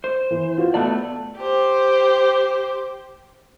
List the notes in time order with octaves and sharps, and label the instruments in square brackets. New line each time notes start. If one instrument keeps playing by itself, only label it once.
[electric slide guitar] C5
[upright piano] E3
F4 F#4 B4
[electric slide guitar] A3 B3 D5 [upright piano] A5
[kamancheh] G4 C5